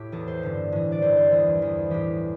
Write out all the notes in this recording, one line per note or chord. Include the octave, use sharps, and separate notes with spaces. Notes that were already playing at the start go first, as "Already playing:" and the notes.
Already playing: A2 E4 G4
E2 E3 A4
C5
G2 D3
A2 E3
D5
G2 E3 C5
C5
E2 E3
E2 E3
A2 E3 G4